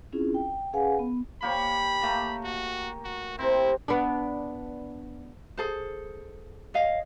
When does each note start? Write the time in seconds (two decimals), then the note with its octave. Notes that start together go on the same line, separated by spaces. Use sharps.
0.12 C4 C#4 E4 F4 G#4
0.34 G5
0.73 C#4 G#4 B4 F5 F#5 G#5
0.99 B3
1.42 A#3 G4 C#5 B5
2.02 A3 A#3 A#5
2.45 F#4
3.05 F#4
3.39 C3 C4 E4
3.88 B3 D4
5.57 G#4 A4 C5
6.74 C#5 D#5 F5